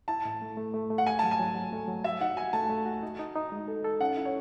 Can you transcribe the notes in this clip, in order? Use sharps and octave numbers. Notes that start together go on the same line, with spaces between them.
E4 A5
A2
A3
A3
A3
A3
F#5
A3 G#5
F#3 A5
G#5
F#3
F#3
A3
F#3
F#4 E5
D#4 F#5
F#4 G#5
A3 A5
A3
F#4
D#4
D#4
D#4
G#3
A4
A4
C#4 F#5
E4
C#5